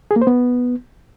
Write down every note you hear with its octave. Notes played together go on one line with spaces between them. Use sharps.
G#4
A#3
C5
B3